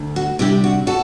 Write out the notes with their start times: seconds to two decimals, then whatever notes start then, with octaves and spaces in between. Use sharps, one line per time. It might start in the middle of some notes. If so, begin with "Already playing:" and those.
Already playing: D2
0.16 F#4
0.39 C3 G3 D4 E4 G4
0.64 F#4
0.87 F#4 A4